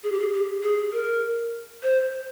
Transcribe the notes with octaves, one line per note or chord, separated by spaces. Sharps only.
G#4
G4
G#4
G4
G#4
A#4
C5